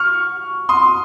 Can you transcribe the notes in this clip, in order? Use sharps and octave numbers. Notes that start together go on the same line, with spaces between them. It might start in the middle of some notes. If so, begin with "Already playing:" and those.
Already playing: C#6 F6
C6 D#6